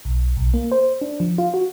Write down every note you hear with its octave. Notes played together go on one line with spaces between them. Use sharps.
B1
B1
A#3
C5
D4
F3
F4
F#4